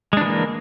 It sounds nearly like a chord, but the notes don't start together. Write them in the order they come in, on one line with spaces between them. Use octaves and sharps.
G#3 D4 E3 A#3